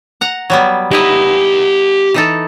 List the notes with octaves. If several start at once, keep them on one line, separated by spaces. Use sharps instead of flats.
F#5 A#5
F#3 G3 B3
D#4 E4 G4 D#5 F#5
E3 D#4 A4